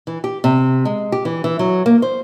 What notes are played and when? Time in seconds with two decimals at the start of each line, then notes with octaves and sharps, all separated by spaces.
0.07 E3
0.24 G4
0.44 C3
0.85 G#3
1.12 G4
1.25 E3
1.44 E3
1.59 F#3
1.86 A#3
2.02 C5